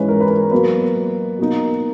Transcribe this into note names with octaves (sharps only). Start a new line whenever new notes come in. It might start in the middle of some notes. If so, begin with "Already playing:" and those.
Already playing: G#2 E3 G#3 C#4 B4
A#4
B4
A#4
B2 F#3 A#3 B4
B2 A#3 D#4